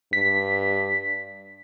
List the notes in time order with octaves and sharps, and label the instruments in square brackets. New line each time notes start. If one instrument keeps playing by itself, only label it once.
[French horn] G2 [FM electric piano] B6